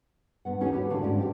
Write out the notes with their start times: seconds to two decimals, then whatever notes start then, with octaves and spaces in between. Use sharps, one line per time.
0.45 G2 B3 F#5
0.61 D#2 C#4 D#4 F#4 G#4 C#5
0.73 G4 B4 C#5 E5
0.90 D#2 A2 D3 D4 F#4 F5
1.02 G#2 C#4 D5
1.18 C4 D4 F#4 G4